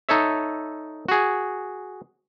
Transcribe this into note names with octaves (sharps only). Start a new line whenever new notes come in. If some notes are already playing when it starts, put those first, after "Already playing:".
D#4 A4 C#5 E5
F#4 G#4